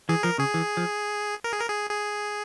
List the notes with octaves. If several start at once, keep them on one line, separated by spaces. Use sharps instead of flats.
E3 G#4
F3 A#4
C#3 G#4
E3
F3
A#4
G#4
A#4
G#4
G#4